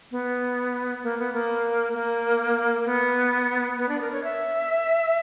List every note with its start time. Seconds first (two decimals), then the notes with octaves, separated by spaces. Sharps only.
0.11 B3
1.03 A#3
1.19 B3
1.34 A#3
1.94 A#3
2.86 B3
3.78 B3
3.89 D4
4.01 A#4
4.13 C#5
4.24 E5